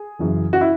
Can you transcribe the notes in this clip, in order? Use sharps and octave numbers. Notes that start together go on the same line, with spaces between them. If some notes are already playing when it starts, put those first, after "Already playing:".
Already playing: G#4
F#2 C#3 E3
F#4
E4